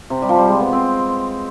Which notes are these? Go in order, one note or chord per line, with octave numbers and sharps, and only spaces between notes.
C3
G3
F3
G3
G#3
B3
C4